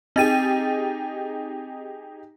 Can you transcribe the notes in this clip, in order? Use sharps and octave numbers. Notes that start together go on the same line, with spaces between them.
C4 D#4 G4 G#4 A6 D#7